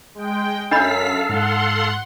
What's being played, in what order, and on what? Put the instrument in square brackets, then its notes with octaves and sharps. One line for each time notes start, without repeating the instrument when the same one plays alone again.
[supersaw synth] G#3 G5
[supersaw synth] F#2 B6 [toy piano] D4 D#5 B5 [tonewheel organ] A4 F5
[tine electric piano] G#2 [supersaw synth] F#5 C6